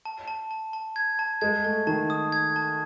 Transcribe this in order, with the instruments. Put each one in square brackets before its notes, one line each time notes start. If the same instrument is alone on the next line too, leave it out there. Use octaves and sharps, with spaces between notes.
[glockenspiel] A5
A5
A5
A5
G#6
A5
[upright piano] G#3 [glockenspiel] G#6
[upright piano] A3 [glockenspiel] A5
[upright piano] D#3 [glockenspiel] A5
[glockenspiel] D#6
G#6
A5